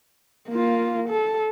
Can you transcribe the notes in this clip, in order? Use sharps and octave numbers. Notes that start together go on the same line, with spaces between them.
A#3 F4
A4